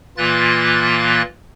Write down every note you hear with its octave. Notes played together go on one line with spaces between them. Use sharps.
A#2 E3 A#3 F4 F#6 A6